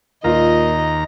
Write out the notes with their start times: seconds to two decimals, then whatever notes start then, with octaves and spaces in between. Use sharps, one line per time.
0.24 D#2 A#2 F4 D#5 A#5